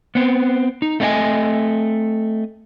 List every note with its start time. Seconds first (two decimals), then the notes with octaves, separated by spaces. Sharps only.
0.15 B3 C4
0.82 D#4
1.00 A3 C4 D4 C#5 D#5 G#5